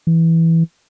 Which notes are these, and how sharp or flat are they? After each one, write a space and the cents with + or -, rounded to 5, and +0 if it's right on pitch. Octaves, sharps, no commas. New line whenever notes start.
E3 -5